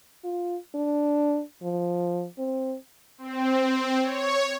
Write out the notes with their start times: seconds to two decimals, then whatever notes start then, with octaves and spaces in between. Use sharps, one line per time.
0.24 F4
0.75 D4
1.63 F3
2.38 C4
3.18 C4
4.02 C#5